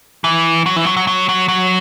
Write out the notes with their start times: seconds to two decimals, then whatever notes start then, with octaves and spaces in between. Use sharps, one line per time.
0.24 E3
0.66 F#3
0.76 E3
0.86 F#3
0.97 F#3
1.07 F#3
1.29 F#3
1.48 F#3